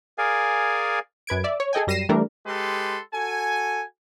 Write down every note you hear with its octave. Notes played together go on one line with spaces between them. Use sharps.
G#4 A#4 D5 F5 G#5
F#2 B4 G#6 D7
D5 E5
C#5
G#4 A4 D#5 G5 G#5
F#2 G3 A#6 C7 D#7 E7
E3 G3 A3 D4 A#4
G#3 G4 A4 B4 C6
F#4 A4 G#5